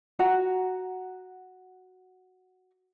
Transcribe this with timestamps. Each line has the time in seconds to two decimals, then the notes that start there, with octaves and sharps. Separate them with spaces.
0.19 F#4 F#5 A#5